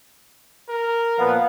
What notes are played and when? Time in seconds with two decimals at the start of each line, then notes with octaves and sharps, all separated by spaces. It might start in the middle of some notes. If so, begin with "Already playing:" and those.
0.69 A#4
1.18 A#2 F3 B3 F5